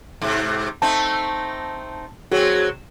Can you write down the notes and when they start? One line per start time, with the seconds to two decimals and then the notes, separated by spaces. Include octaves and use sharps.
0.22 G#2 C3
0.82 A3 C4 D#4 A5
2.32 F#3 C4 F#4 G#4 C#5